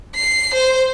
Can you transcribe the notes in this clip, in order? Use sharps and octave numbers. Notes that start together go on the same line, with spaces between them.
C7
C5